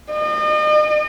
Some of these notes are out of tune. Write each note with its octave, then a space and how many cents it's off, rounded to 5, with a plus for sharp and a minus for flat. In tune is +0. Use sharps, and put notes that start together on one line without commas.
D#5 -40